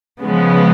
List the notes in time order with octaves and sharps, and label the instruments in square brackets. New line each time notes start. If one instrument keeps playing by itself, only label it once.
[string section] C#3 F3 G#3 B3